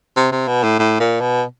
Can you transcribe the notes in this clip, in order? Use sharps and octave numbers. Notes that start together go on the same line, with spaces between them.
C3
C3
B2
A2
A2
A#2
B2